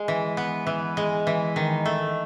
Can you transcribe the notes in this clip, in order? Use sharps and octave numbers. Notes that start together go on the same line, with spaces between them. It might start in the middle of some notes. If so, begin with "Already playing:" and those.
Already playing: G#3
E3
B3
E3
G#3
E3
D#3
A3